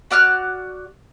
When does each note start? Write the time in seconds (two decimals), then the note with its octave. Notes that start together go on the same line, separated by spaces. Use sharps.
0.11 F#4 D5 F6 F#6